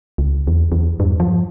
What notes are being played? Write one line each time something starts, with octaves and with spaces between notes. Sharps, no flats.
C#2
E2
E2
G2
F3